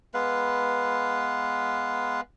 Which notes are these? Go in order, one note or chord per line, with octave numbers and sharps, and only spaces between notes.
G#3 B3 B4 F5